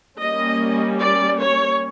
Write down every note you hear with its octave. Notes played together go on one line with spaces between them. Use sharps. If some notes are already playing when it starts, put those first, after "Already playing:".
G3 A#3 C#4 D#5
D5
C#5